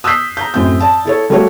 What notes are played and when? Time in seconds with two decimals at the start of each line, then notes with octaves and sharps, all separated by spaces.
0.04 D#6 E6 F#6 G6 B6 C7
0.37 A#5 G6
0.54 F#2 A2 C4 G6
0.80 D5 A5
1.05 E4 A4 C#5
1.30 G3 A3 A#3 F#4 G4 C#5